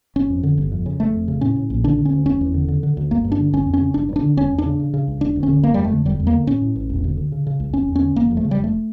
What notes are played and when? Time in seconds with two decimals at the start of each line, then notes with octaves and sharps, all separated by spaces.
0.16 G1 C#4
0.30 F2
0.43 D3
0.58 G1
0.72 F2
0.86 C#3
1.00 F1 A3
1.14 F2
1.28 C#3
1.41 A2 C#4
1.56 A2
1.70 A#1
1.84 D3 D4
1.98 D3
2.05 C#4
2.12 D2
2.26 F1 C#4
2.41 E2
2.54 D3
2.68 D3
2.83 D3
2.97 D2
3.11 G1 A#3
3.24 G2
3.32 D4
3.39 D3
3.53 G1 C#4
3.67 F2
3.74 C#4
3.81 C#3
3.94 G1 D4
4.09 G2
4.16 D4
4.23 D3
4.37 E1 C#4
4.51 E2
4.58 D4
4.65 C#3
4.79 C#3
4.94 C#3
5.08 C#2
5.21 E1 D4
5.36 D2
5.43 C#4
5.49 D3
5.63 G1 A#3
5.74 F2 G3
5.84 A3
5.92 D3
6.05 E1 G3
6.20 E2
6.27 A#3
6.33 D3
6.47 A2 C#4
6.62 A2
6.76 A1
6.90 E1
7.04 D2
7.17 D3
7.32 C#3
7.47 C#3
7.60 C#2
7.73 F1 C#4
7.88 E2
7.96 C#4
8.02 D3
8.16 F1 A#3
8.31 F2
8.37 A3
8.44 C#3
8.51 G3
8.58 F1
8.64 A3